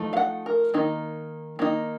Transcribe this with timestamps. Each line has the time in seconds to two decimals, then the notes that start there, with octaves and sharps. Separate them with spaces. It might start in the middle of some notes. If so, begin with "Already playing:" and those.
Already playing: F3 A3 D#4
0.13 F5
0.17 F#5
0.46 A#4
0.74 D#3 A#3 D#4
1.59 D#3 A#3 D#4